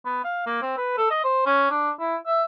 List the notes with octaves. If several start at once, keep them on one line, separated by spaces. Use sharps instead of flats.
B3
F5
A#3
C4
B4
A4
D#5
C5
C#4
D4
E4
E5